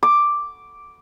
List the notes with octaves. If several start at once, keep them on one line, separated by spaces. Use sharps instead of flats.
D6